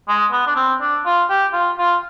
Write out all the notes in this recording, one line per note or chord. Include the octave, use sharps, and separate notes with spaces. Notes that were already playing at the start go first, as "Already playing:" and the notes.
G#3
B3
D4
C4
D4
F4
G4
F4
F4